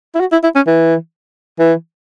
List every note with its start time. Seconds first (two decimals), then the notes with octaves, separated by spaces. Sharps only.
0.15 E4
0.20 F#4
0.32 E4
0.43 E4
0.55 C#4
0.67 E3
1.59 E3